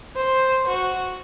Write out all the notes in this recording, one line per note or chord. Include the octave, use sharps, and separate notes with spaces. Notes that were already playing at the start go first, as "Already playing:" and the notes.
C5
F#4